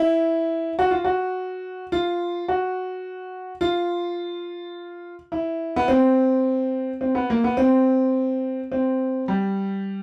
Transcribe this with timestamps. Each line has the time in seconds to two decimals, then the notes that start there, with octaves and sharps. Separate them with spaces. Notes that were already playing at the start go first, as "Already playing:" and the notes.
Already playing: E4
0.79 F#4
0.91 F4
1.05 F#4
1.92 F4
2.48 F#4
3.61 F4
5.32 E4
5.76 B3
5.88 C4
7.01 C4
7.15 B3
7.30 A#3
7.44 B3
7.57 C4
8.72 C4
9.28 G3